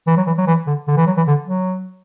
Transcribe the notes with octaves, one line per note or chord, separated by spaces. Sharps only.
E3
F#3
E3
F#3
E3
D3
D3
E3
F#3
E3
D3
F#3